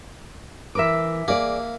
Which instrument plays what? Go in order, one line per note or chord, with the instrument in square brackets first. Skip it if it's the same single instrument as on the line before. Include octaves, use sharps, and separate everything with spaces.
[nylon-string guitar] E3 A#4 B4 [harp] E5 D6
[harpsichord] A#3 [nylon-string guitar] G#4 D5